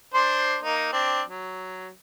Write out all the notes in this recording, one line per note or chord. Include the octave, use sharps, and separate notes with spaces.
D4 C5 C6
A#3 D#4
C4 D4
F#3